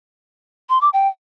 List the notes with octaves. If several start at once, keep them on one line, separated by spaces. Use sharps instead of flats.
C6
D6
G5